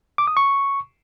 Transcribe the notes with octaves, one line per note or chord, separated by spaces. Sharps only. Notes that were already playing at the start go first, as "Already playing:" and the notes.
D6
D#6
C#6